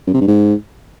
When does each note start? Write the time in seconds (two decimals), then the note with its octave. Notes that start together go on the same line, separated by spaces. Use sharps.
0.07 F#2
0.14 C3
0.21 G2
0.28 G#2